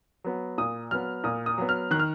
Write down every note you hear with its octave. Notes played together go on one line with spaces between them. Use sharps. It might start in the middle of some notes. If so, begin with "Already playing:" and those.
F#3 B3
A#2 D#6
F#3 B3 F6
A#2 D#6
D#6
F#3 B3
F6
D#3 F#6
F6